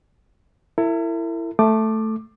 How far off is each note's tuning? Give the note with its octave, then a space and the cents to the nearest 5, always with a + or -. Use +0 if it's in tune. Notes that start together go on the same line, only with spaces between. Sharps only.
E4 +15 A#4 -45
A3 +0 D6 +20